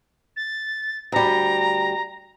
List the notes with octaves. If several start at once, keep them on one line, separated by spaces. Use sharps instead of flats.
A6
D2 G3 A#5